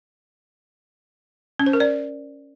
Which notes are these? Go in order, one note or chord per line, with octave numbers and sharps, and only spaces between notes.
C#4
C5
A#4
D5